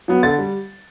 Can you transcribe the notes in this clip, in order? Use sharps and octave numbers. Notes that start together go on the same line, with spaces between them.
F#3 B3
D3 A6
G3